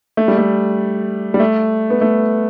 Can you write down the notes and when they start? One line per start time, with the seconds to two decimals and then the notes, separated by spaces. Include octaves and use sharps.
0.17 A3
0.28 G3
0.38 A3
1.34 G3
1.40 A3
1.90 B3
2.01 A3